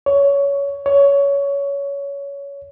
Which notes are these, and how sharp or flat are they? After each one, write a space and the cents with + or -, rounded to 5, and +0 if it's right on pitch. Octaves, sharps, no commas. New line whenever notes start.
C#5 +20
C#5 +20